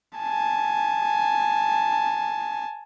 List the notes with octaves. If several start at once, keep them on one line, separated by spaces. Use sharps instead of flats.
G#5 A5